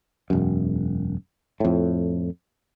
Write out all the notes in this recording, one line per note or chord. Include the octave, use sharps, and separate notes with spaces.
E1 F#2
F2 A2